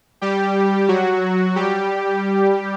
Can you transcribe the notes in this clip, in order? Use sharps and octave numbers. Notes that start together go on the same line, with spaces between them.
G3 G4
F#3 F#4
G3 G4